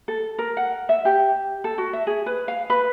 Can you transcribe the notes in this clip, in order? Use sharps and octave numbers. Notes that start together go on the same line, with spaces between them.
A4
A#4
F#5
E5
G4
A4
F#4
E5
G#4
B4
F5
B4